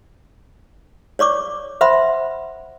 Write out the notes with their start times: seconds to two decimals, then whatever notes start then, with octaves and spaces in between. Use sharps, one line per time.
1.19 C#5 D5 C#6 D6
1.81 C5 E5 F#5 B5 C6